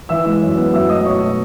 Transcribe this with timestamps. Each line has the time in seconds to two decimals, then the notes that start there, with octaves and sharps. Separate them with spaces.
0.09 E3 E5 E6
0.26 G#3
0.42 F#2
0.58 B3
0.73 F#3 E5 E6
0.89 A3 D#5 D#6
1.05 B2 C#5 C#6
1.21 B2